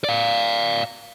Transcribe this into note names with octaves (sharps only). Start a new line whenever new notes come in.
D5 F5